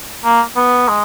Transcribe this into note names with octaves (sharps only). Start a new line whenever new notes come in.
A#3
B3
G#3